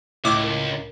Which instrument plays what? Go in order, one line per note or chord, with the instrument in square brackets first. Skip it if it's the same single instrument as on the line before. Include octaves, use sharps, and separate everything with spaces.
[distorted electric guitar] C#2 [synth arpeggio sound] A2 D6 [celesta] D#5 E5
[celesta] A#4